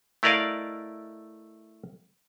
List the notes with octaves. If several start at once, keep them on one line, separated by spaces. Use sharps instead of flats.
A3 E4 A#4 D5 D#5 F5